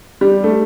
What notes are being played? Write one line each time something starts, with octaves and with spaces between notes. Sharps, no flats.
G3
A3